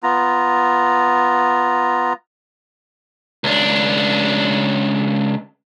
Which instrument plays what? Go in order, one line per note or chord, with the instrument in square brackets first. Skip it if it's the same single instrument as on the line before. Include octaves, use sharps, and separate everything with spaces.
[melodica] B3 F4 A#5
[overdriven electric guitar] C#2 D4